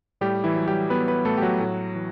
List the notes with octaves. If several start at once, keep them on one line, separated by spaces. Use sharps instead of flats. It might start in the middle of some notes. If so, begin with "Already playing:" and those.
A2 G3 G4
E3 E4
F#3
G3 G4
F#3 B3 B4
B3 B4
A2 A3 A4
G4
F#3 F#4
A2
E3